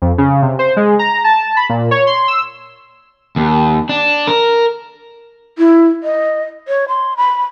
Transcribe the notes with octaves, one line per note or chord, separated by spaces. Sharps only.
F2
C#3
C3
C5
G#3
A#5
A5
B5
A#2
C#5
C6
E6
D#2
D4
A#4
E4
D#5
C#5
C6
B5